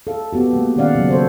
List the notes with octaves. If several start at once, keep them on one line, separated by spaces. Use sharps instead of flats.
A4 F5
B3 F#4 G4
G#3 A#3
D#3 G#3 C#4 D5 F5 F#5
C#3 F#3
A4 C5 C#5